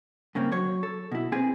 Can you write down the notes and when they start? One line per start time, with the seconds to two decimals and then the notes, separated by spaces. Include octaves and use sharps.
0.35 G2 C#3 A#3 C4
0.52 F#3 C#5
0.83 A4
1.12 B2 E4
1.32 C4 G#4 B4 G#5